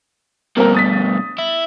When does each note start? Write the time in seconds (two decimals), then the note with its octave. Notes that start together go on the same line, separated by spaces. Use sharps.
0.57 G2 B2 A#3 C4 A#4
0.75 D#6 A6 B6
1.38 E4